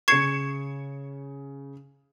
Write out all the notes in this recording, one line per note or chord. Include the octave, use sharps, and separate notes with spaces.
C#3 C#6 G#6 C7 C#7 E7